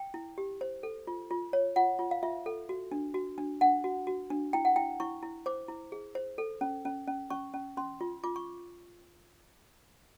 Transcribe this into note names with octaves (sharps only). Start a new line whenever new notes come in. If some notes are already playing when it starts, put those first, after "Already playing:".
Already playing: G5
E4
G4
C5
A4
F4
F4
C#5
F4 F#5
F4
F5
F4 E5
A4
F#4
D4
F#4
D4
D4 F#5
F#4
F#4
D4
E4 G5
F#5
E4 G5
E4 C#6
E4
C5 D6
E4
G#4
C5
A4
C#4
C#4
C#4
C#4 C#6
C#4
C#4 C6
F4
F4 D6
C#6